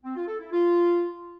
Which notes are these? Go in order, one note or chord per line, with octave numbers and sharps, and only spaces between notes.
C4
F4
A4
E4
F4